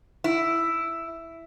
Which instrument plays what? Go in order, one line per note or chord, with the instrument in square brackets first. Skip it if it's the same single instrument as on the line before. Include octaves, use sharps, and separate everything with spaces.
[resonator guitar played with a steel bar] E4